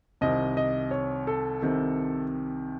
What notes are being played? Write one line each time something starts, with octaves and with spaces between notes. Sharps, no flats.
C2 C3 D#3 D#5
D#5
C#5
A4
C2 C3 D#3